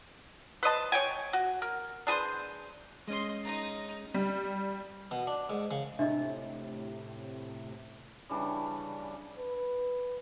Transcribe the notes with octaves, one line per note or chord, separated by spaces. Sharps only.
B4 C5 D#5 A5
C#5 G5 G#5
F#4
A#4
D4 G#4 B4 C5
G#3 C#4 D#5 C6
D#4 A#5
G3
B2
D4
G#2
C#3
A2 C3 D4 D#5 E5
C#3 E3 G3 D4
B4